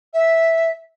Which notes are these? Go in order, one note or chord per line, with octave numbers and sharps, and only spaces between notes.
E5